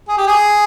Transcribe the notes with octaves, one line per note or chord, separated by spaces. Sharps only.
G#4
G4
G#4